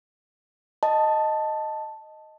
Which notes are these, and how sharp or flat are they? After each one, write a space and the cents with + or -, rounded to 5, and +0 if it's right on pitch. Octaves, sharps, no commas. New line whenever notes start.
D#5 +0 A5 +0